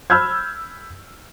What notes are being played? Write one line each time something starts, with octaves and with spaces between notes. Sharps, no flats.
B5 E6 F6 G6 G#6